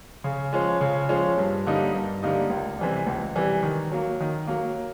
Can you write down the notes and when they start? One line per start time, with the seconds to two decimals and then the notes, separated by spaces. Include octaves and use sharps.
0.24 C#3
0.53 F3 G#3 C#4
0.81 C#3
1.09 F3 G#3 C#4
1.38 G2
1.66 D3 G3 A#3 D#4
1.95 G2
2.23 D3 G3 A#3 D#4
2.50 C#2
2.79 C3 E3 G3
3.07 C#2
3.36 C3 E3 G3
3.63 D#3
3.92 F#3 A#3
4.20 D#3
4.47 F#3 A#3